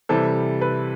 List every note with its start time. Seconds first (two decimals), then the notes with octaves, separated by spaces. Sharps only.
0.09 C3 E3 G3 A4
0.61 B4